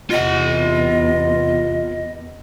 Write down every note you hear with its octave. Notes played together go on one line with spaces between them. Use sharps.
E2 C3 B3 F4 D#5 F#5